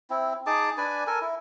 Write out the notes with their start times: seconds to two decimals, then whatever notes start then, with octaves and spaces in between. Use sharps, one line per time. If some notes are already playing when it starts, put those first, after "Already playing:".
0.10 C4 E4
0.47 D#4 G#4 A5 D6
0.78 D4 B4 D5 G#5
1.07 A4 A#4 G#5
1.22 E4